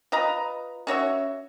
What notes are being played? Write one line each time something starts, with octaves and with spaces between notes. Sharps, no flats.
F4 B4 D#5 A#5
C#4 F#4 C#5 E5